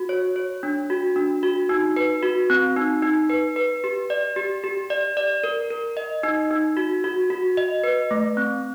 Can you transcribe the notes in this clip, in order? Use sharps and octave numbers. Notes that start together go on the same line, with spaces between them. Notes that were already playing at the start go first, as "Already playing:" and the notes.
Already playing: F#4
C#5
C#5
D4
F#4
D4
F#4
D#4
B4
F#4
C4
D#4
D#4
B4
B4
G4
D5
G4
G4
D5
D5
A#4
A#4
D#5
D#4
D#4
F#4
F#4
F#4
D#5
B4
A3
C4